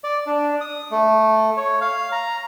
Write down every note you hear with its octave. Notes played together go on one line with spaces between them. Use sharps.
D5
D4
D#6
A3
C#5
F5
A#5